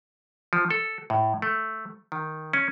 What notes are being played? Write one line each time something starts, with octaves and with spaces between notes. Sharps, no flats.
F3
A4
A2
A3
D#3
C#4